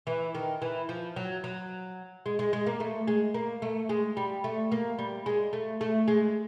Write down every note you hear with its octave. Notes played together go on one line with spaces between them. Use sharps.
E3
D#3
E3
F3
F#3
F#3
G#3
G#3
G#3
A#3
A3
G#3
A#3
A3
G#3
G3
A3
A#3
G3
G#3
A3
A3
G#3